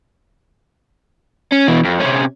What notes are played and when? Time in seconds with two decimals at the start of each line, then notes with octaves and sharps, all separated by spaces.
1.52 C#4
1.68 B2 E3
1.85 F2
2.00 C3 C#4